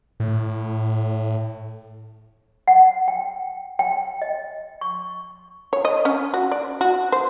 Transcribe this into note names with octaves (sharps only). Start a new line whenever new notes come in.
A2
F#5
G5
G5
D#5
C#6
C#5
D#5
C#4
F#4
D5
F#4
C5